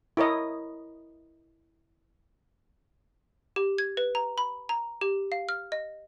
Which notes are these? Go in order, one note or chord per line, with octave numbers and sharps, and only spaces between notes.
E4 A#4 C#5 D#5
G4
G#6
B4
A#5
B5
A#5
G4
F5
F6
D#5